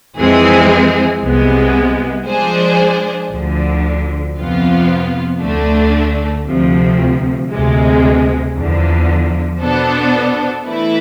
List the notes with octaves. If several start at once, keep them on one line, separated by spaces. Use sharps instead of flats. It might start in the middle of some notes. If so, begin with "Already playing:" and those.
F2 E3 G#3 C4 G#4
C2 C3 G#3 B3
F3 G#3 D4 G#4 C5
D2 D3 F3
F2 C3 F3 B3 F4
D2 D3 A3 D4
D2 C3 F3
D2 C3 G#3
E2 D3 F3
B2 B3 D4 A4 C5
E3 A3 E4 B4